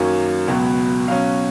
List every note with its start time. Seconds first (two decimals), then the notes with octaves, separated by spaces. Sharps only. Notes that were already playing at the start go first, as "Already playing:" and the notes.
Already playing: F#2 D#3 F#3 A#3 C#4 F5
0.48 C#2 B2 F#3 B3
1.07 B2 F#3 C#4 F5